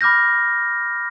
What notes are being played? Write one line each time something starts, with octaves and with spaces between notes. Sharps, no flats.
B5 D6 F6 G6 A#6